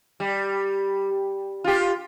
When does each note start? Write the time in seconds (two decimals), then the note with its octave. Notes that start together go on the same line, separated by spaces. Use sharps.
0.20 G3
1.64 F4 G4